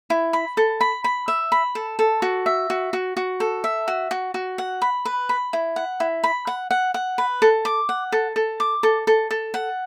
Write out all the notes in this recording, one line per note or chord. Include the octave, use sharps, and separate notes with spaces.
E4
B5
A4
B5
B5
E5
B5
A4
A4
F#4
E5
F#4
F#4
F#4
A4
E5
F#4
F#4
F#4
F#5
B5
B4
B5
E4
F#5
E4
B5
F#5
F#5
F#5
B4
A4
D6
F#5
A4
A4
D6
A4
A4
A4
F#5